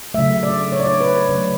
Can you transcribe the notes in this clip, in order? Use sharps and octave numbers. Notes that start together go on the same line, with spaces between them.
C#3 F#3 A3 E5
D5
C#5
D5
C#5
B4
C#3 F#3 A3